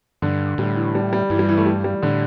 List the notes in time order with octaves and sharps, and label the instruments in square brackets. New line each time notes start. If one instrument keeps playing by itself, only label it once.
[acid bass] G2 [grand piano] D3
[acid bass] A2 [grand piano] G3
[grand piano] E3
G3
G3
[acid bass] G2 [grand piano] E3
[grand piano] G3
E3
A3
G3
G3
[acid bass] A2 [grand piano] D3